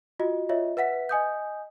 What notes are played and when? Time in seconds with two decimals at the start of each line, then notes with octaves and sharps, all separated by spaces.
0.19 F4 F#4 D#5
0.49 F4 C#5 D#5 E5
0.77 B4 E5 F#5 B6
1.09 D#5 G#5 D#6 G6